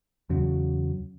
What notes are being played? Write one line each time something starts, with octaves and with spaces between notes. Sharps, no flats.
E2 C#3 F#3